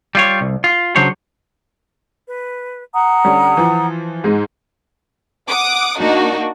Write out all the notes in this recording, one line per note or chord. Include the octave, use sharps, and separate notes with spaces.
G3 F4 C#5
C2
F4
C#3 F#3 D4 C5 C#5
B4
F#5 A#5 D#6
D3 G3 C#4
E3 F3
G#2 G#3 D#4
F#5 D6 D#6
A#3 D4 D#4 F#4